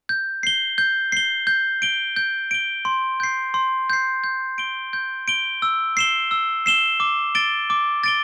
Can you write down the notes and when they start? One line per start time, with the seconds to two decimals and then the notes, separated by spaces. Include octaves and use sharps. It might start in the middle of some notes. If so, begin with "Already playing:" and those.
0.09 G6
0.43 C7 G7
0.78 G6
1.12 C7 G7
1.47 G6
1.82 D7 G7
2.16 G6
2.51 D7 G7
2.85 C6
3.20 G6 C7
3.54 C6
3.90 G6 C7
4.24 G6
4.58 D7 G7
4.93 G6
5.28 D7 G7
5.62 E6
5.97 C7 E7 G7
6.31 E6
6.66 C7 E7 G7
7.00 D6
7.35 A6 D7 G7
7.70 D6
8.04 A6 D7 G7